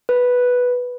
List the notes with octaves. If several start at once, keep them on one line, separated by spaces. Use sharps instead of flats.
B4